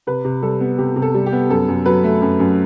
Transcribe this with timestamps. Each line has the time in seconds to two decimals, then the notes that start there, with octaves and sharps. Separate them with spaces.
0.07 C3 B4
0.24 C3
0.42 G3 A4
0.60 B3
0.78 C3 G4
0.96 C3
1.02 A4
1.14 G3
1.26 G4
1.33 B3
1.50 F#2 A4
1.68 F#2
1.86 F#3 B4
2.04 A3
2.22 F#2
2.40 F#2